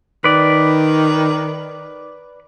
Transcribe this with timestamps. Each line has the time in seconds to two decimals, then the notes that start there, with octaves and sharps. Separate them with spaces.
0.24 D#3 B4 D5